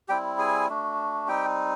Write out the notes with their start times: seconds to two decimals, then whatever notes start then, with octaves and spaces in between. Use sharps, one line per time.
0.08 G3 C4 E4 G4 G5
0.38 G#4 G#5
0.69 A3 D4 F#4
1.28 G3 C4 D#4 G4 G5